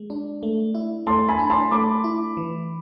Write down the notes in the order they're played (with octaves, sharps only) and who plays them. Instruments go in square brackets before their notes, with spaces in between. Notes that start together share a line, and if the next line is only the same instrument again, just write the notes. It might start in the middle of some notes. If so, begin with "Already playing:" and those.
Already playing: [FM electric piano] G#3
D4
A3
E4
[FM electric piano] A3 [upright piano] A5 C6
[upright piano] G#5 B5
[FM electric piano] D4
[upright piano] A5 C6
[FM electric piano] A3 [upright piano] B5 D6
[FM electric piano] E4
E3